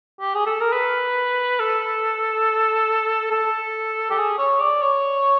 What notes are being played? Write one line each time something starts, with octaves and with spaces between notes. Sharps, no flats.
G4
G#4
A4
A#4
B4
A4
A4
G4
G#4
C#5
D5
C#5